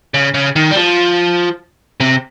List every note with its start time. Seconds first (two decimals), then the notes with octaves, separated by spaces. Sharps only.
0.14 C#3
0.34 C#3
0.56 D#3
0.71 G3
0.76 F3
2.00 C3